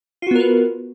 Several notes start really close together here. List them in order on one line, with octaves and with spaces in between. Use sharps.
F4 F#4 B3 A#4 B4